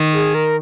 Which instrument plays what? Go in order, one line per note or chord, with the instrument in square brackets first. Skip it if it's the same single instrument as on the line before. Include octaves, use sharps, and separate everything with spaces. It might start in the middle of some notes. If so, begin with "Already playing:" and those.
Already playing: [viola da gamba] D#3
[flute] G#4
A#4